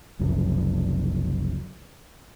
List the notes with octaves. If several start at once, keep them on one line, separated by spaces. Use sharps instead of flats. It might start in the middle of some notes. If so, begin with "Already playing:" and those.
F#1 C2 F#2 F3